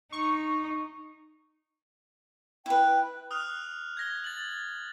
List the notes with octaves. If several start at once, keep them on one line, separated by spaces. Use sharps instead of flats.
D#4 C#6
E4 B4 G5
D#6 F6 F#6 F7
G#6 A#6 G7
A6 F#7